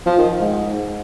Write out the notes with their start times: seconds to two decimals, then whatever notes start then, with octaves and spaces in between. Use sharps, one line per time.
0.06 F3
0.18 D#3
0.41 G#2